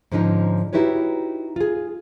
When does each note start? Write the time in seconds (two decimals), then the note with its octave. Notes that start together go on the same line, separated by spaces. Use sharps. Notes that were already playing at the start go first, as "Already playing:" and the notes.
0.12 G#2 D3 F3 C#4 D#4
0.73 D#4 E4 F#4 G4 B4 C#5
1.56 F4 G#4